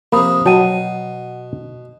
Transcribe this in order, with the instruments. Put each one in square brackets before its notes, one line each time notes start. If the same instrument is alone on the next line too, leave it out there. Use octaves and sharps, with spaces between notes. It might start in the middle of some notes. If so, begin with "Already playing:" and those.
[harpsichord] C3 F3 [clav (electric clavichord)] A#3 [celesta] B5 D#6
[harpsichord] B2 [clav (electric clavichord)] F#3 G5 A5 [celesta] F#5 D#7